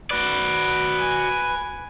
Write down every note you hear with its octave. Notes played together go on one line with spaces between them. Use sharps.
F#4 B4 D5
G#5